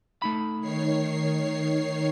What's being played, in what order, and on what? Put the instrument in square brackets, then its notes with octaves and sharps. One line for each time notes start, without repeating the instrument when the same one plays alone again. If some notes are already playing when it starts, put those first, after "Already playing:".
[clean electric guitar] A3 D#4 B5
[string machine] D#3 C#5 C7